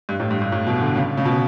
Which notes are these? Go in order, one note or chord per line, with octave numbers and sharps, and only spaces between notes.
G2
A2
G2
G2
A2
B2
D3
C#3
C#3
B2